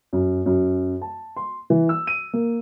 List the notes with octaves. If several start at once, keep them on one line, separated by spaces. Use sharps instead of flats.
F#2
F#2
A5
C6
E3
E6
D#7
A#3